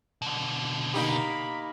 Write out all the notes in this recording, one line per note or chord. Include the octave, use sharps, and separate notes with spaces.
B2 D3
A#3 D#4 G4 B5